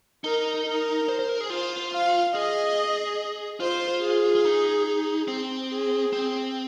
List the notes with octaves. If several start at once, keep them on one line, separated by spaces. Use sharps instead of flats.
D#4 A#4
A#4
C5
C5
A#4
G#4
F4 C5
F5
G#4 D#5
F4 C5
G#4
F4
D#4
C4
G#4
C4